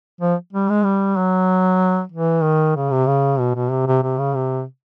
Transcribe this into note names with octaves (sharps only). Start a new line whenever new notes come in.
F3
G3
G#3
G3
F#3
E3
D#3
C#3
C3
C#3
B2
B2
C3
C3
C3
C#3
C3